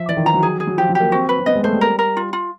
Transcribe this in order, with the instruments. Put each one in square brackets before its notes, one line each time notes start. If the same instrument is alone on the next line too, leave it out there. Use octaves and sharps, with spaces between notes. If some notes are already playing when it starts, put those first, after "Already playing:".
Already playing: [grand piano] F3 [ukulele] E5
[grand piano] E3 [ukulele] D5
[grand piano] D#3
[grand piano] F3 [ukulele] A#5
[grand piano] F#3
[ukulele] G#4
G#4
[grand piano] F#3
[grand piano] F3 [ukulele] G4
[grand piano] F#3
[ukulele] G4
[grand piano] A#3
[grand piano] C4 [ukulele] F#4
[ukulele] B4
[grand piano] C4
[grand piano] B3 [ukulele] D#5
[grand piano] G#3
[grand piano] A3 [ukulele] C5
[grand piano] G3
[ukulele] A#4
A#4
F4
F4